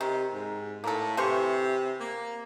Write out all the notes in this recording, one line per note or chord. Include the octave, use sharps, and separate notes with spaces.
C3 D#3
G#2
A2 A#3 A4
C3 E3 C5 C#6
A#3